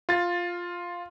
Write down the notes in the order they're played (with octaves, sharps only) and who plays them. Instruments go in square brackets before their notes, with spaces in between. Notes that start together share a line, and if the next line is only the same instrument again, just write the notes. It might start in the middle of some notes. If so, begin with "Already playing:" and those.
[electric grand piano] F4 A6